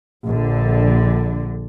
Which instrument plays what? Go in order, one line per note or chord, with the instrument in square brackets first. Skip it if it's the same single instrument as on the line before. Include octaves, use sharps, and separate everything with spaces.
[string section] A#1 D3